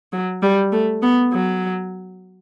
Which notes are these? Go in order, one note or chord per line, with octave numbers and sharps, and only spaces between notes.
F#3
G3
A3
B3
F#3